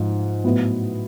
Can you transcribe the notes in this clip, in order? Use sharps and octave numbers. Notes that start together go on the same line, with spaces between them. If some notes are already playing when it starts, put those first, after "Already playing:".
Already playing: G#2 F3
A2 F#3 B3